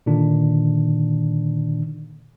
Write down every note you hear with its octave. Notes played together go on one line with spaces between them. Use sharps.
A#2 D3 D#3 D4